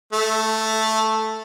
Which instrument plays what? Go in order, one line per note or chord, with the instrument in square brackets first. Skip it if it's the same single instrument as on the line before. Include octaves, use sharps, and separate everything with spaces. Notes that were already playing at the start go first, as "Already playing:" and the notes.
[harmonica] A3